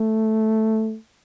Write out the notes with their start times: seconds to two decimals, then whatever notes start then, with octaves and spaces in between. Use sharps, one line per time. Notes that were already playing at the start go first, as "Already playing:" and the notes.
Already playing: A3